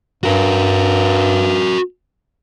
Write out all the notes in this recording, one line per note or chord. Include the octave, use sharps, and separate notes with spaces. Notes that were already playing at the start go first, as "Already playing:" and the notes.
G2 F#4 A#4